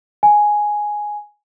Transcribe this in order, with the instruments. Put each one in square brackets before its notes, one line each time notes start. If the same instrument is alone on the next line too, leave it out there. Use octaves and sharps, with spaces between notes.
[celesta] G#5